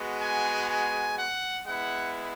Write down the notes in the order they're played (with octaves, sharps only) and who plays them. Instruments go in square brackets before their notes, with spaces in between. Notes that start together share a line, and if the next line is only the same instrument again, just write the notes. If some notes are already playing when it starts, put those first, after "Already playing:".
Already playing: [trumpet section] G#3 B3 F#4
G#5
G#5
F#5
G#3 B3 E4 F#5